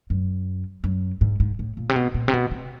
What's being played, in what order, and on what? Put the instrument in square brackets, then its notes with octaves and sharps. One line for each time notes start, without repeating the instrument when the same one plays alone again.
[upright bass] F#2
F#2
G#2
G#2
A2
A#2
C3
B2
A#2
C3
B2
C3